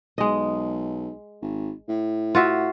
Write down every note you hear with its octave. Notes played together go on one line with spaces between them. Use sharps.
B1 G#3 D#5
G#1
A2
F4 F#4 E5